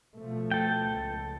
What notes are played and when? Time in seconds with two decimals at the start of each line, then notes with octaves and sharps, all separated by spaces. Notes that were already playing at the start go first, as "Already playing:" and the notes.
0.20 B2 F3 A3
0.51 A4 G5
0.92 C#2